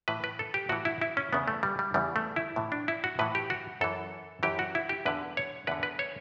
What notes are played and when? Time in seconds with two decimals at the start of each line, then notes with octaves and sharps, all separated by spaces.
0.08 A2 E3 B4
0.24 B4
0.39 A4
0.54 G4
0.69 A2 E3 F#4
0.85 E4
1.01 E4
1.17 C#4
1.32 E2 C#3 E3 B3
1.48 A3
1.63 G3
1.79 G3
1.94 E2 C#3 E3 G3
2.16 A3
2.36 E4
2.56 A2 E3
2.72 D4
2.88 E4
3.04 F#4
3.19 A2 E3 B4
3.35 G4
3.50 F#4
3.81 F#2 E3 A4
4.43 F#2 E3 G4
4.59 F#4
4.75 E4
4.89 G4
5.06 E2 D3 B4
5.37 C#5
5.67 E2 D3 B4
5.83 B4
5.99 C#5